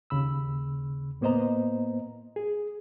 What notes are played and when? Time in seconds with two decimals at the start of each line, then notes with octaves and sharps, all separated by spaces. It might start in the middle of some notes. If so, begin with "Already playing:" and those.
0.10 D#2 C#3 B5 E6
1.21 A2 A#3 B3 C5 D#5 A#5
2.36 G#4